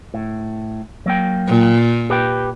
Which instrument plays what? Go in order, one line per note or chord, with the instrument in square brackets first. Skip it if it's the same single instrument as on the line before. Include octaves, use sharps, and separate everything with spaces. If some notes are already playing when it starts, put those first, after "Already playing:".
[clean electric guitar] A2
F#3 A#3 G5
[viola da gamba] A#2
[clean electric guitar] G4 B4 G5